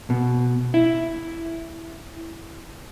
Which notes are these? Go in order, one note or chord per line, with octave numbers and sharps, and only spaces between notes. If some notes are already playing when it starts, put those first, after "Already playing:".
B2
E4